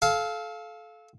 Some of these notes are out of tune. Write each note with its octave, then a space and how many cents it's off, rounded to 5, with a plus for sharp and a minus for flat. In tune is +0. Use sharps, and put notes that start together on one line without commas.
A4 -25 F5 +0